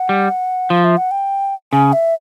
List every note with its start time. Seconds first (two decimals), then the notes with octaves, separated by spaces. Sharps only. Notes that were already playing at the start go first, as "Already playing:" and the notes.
Already playing: F#5
0.09 G3
0.70 F3 F5
0.84 E5
0.97 F#5
1.11 G5
1.72 C#3 G#5
1.93 E5